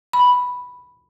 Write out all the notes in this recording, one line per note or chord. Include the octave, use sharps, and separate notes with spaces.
B5